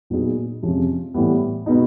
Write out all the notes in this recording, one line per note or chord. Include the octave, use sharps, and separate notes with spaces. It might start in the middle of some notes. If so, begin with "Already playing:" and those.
A#2 F#3 B3 D#4 G#4
F2 C3 F3 G#3 C#4
A2 E3 G3 B3
B2 G#3 B3 D#4